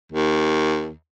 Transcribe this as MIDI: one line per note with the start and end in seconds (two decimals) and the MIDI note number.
0.12 0.92 39